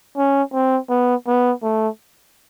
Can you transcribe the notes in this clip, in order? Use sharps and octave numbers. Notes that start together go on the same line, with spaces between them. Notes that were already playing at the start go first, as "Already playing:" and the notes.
C#4
C4
B3
B3
A3